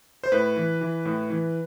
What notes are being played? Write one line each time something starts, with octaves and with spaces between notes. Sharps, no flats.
C5
A2 B4
E3
E3
A2
E3